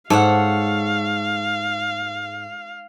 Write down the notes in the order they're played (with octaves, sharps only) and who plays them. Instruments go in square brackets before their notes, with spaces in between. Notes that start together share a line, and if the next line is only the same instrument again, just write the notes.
[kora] G#2 [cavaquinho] A4 C#5 F#5 [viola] F5